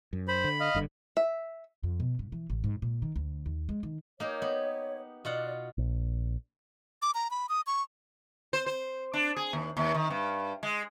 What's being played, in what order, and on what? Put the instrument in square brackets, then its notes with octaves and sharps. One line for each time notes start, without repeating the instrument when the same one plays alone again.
[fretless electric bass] F#2
[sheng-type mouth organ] C5 [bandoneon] B5
[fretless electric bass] D3
[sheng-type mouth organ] D#5 F5
[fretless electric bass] F#1 G2 D3
[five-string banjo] E5
[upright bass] F2
B2
G2
E3
A1
G#2
A#2
D#3
D2
D#2
G#3
D#3
[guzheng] A#3 D#4 G4 [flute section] C#5
[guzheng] B3
[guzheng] B2 F4 F#5 [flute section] D5
[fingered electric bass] A#1
[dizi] D6
A#5
B5
D#6
C#6
[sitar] C5
C5
D4
G#4
D#2
D#2
D#3
G2
G#3